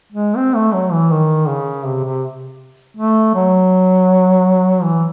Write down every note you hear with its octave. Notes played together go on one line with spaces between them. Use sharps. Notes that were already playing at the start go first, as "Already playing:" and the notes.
G#3
C4
A3
F#3
E3
D#3
C#3
C3
C3
A3
F#3
E3